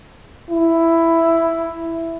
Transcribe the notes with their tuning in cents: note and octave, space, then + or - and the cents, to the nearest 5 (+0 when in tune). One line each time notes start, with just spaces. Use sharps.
E4 +5